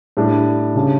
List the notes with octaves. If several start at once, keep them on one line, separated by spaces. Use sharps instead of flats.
A2 G3 D4
C#3 G3 D4